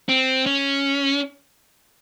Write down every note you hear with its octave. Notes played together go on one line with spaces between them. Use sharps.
C4
C#4